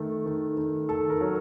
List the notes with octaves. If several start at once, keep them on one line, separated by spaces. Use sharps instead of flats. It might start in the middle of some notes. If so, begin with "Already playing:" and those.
Already playing: D#3 A3 A4
D#3
D#3
D#3 A4
A#4
F#3